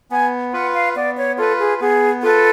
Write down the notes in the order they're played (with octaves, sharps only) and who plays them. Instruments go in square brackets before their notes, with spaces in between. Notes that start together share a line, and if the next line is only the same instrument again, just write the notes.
[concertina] B3 [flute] G#5
[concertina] F4 B4 [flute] F#5
[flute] F5
[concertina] B3 [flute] D5
[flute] C#5
[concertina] F4 B4 [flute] A4
[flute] G#4
[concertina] B3 [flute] G#4
[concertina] F4 B4 [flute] A4